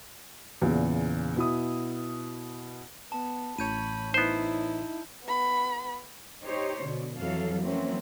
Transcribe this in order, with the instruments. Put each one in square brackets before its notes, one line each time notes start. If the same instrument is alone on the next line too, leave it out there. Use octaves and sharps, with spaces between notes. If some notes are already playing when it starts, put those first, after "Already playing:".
[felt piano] E2 A#2 C#3
B2 E4 D#6
[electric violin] B3 [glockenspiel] A5
[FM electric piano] A1 C#5 [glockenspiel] A5 G6 D#7 [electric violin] B5
[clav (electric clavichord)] B3 C5 [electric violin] D#4 E4
[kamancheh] B3 B5
[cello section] D#4 G4 C5 C#5
B2 D3
F2 E3 F#3 A4 F5
E3 F#3 A3 A#3 C4 C#4